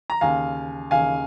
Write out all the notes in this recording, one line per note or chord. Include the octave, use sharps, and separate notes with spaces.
A#5
D#2 C#3 F5 G#5
D#2 C#3 F5 G#5